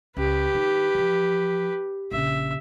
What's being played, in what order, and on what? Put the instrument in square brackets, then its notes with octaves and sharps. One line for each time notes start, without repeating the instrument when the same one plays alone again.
[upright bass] C#2 [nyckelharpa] G4 B4
[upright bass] D#3
E3 F3
[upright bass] A#1 C#3 [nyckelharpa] E5